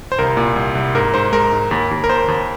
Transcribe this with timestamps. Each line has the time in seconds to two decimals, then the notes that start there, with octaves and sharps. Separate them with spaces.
0.12 C5
0.19 C2 A#4
0.37 A#2
0.56 C2
0.75 C2
0.95 G#2 A#4
1.14 G#2 C5
1.32 G#3 A#4
1.52 G#2
1.71 D#2
1.91 D#2
2.04 A#4
2.09 D#2 C5
2.28 D#2